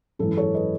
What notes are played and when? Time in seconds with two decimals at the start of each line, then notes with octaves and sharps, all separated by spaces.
0.19 G#1 F#2 E3 A4
0.37 A4 C#5
0.54 B4 D#5